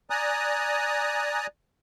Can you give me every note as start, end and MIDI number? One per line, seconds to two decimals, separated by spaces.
0.10 1.47 74
0.10 1.47 80
0.10 1.47 82
0.10 1.47 87
0.10 1.47 90